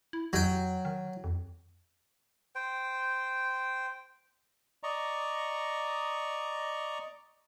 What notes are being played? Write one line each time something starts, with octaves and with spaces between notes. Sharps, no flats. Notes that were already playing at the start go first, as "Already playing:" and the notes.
E4
F2 F#3 G5
D#3
F2
C5 G5
D5 D#5 A#5 C#6